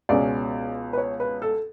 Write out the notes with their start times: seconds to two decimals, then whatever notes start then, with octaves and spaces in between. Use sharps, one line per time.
0.09 C#2 B2 G#3 C#4 D5
0.93 B4
0.97 C#5
1.20 B4
1.42 A4